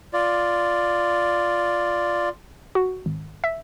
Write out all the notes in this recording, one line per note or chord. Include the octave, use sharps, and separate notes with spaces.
F4 D5
F#4
G#1
E5